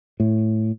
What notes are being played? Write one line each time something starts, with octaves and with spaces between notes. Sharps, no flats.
A2